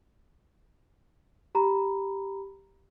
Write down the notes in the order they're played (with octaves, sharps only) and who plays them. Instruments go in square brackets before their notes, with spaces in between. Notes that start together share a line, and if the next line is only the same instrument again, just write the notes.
[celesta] G4 A#5 B5